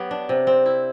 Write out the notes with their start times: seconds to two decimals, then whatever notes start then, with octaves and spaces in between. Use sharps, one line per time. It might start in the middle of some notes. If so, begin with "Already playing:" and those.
Already playing: F#3 B3 G4
0.11 D4
0.29 C3
0.47 C4
0.66 E4